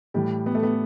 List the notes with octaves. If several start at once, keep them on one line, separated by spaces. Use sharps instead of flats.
A2 E3 G3
B3
A3
B3